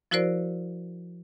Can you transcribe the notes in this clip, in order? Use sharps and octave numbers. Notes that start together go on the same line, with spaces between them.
F3 E4 F#4 A#4 C5 D5